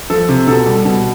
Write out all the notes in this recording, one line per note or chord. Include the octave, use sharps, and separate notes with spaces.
F3 A4
C3
B2 A4
G3
B2